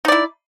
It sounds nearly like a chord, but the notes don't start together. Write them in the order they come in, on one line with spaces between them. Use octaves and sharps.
D#4 D5 E4